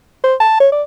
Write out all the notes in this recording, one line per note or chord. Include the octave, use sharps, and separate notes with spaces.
C5
A5
C#5
D5